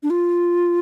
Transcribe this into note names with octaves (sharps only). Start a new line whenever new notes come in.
D4
F4